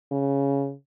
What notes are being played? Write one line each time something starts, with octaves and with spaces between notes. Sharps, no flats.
C#3